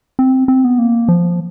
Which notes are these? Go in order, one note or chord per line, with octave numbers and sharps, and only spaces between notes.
C4
C4
B3
A#3
F3